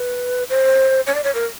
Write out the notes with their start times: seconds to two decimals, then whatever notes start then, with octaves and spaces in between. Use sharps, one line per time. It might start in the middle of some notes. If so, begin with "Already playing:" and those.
Already playing: B4
0.50 C5
1.06 C#5
1.15 D5
1.24 C#5
1.35 A#4